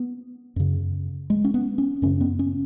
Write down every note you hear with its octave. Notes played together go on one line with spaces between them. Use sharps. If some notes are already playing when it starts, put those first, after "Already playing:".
Already playing: B3
F#2 C#3
G#3
C#4
B3
C#4
F#2 C#3 C#4
B3
C#4